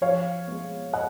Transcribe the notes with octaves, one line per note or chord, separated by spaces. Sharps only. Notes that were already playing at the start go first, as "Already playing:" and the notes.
F3 C#5 F5
G#3 B3
D#5 F#5